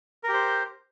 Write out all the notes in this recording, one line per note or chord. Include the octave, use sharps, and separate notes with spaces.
G4 A#4 C5